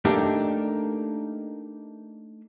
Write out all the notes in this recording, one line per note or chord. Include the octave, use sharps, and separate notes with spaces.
A3 A#3 D4 D#4 G4